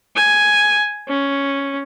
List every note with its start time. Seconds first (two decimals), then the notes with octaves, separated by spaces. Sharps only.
0.16 G#5
1.08 C#4